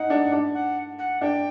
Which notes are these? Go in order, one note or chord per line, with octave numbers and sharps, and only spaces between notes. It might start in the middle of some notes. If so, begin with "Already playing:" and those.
Already playing: D#4 F#5
D4
D4
F#5
F#5
D4 G5